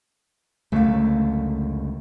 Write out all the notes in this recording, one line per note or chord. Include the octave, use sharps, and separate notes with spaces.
C#2 F#2 D3 A3 F5